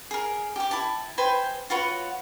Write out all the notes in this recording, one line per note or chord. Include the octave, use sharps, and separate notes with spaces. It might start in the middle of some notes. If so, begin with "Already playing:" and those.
G#4 A#4
G4 D6
E4 A5
B4 C5 G5 G#5
F4 F#4 B4 C#5